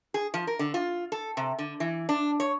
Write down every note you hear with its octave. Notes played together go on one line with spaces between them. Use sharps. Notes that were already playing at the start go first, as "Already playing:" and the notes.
G#4
F3
A#4
D3
F4
A4
C3
D3
E3
D4
C#5